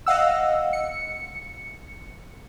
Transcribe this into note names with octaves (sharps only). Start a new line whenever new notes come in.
D#5 F5 F#5 E6
C#7